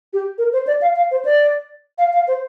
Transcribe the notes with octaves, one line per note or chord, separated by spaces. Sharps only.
G4
A#4
C5
D5
F5
F5
C5
D5
F5
F5
C5